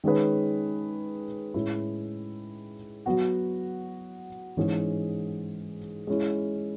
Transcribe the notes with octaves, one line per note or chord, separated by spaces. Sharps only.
D#3 G#3 C#4 G#4 B4
A2 G#3 C#4 E4 G#4
F#3 B3 F#4
G#2 E3 G#3 C#4 G#4
G#3 C#4 E4